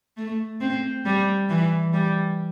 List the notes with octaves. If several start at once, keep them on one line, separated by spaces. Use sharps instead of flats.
A3
C4
G3
E3
G3